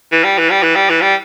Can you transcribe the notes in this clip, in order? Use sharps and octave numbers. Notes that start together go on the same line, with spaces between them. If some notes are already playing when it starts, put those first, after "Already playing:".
E3
G3
E3
G3
E3
G3
E3
G3